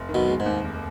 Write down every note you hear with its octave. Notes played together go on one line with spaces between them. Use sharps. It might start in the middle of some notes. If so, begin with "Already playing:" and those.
Already playing: F1
D#3
B1 B2
G#3
G#2
D#2
F1